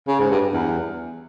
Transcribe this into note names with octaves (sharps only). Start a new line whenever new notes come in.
C#3
G#2
G2
G2
E2